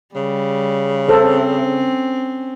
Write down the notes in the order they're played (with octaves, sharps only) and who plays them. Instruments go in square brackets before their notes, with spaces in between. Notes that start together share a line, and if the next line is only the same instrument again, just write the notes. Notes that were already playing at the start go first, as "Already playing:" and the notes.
[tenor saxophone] C#3 [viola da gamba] G3
[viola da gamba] C4 C#4 [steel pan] A4 C5